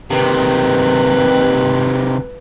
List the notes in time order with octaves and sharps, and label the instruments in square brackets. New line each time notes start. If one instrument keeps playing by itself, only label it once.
[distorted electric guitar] C3 D#3 [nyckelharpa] B4